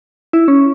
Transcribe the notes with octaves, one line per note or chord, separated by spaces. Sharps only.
E4
C#4